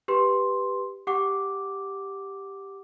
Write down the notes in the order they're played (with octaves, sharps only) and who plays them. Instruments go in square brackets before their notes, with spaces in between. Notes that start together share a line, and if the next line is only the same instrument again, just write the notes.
[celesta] G4 B4 C6
G4 F#5 D6